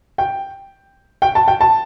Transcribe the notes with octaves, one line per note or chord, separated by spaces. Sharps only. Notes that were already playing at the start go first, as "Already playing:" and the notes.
G5
G5
A5
G5
A5